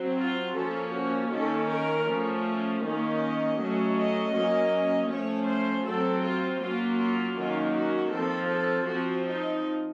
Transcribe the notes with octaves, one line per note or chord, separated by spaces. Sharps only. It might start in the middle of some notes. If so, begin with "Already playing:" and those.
Already playing: F#3 C4
F4
F3 A#3 C#4 A4
F#4
D#3 A#3 C#4 A4
A#4
F3 A3 C#4
D#3 A#3 C#4 D#5
F#3 A3 C#4
D#5
F#3 A#3 C#4
F3 A3 C#4 C#5
C5
F#3 C4 A4
F4
F#3 A#3 C#4 F4
F4
D#3 F#3 A#3 C#4 F4
F#4
F3 C4 A4
A4
F3 C4 F#4
D#4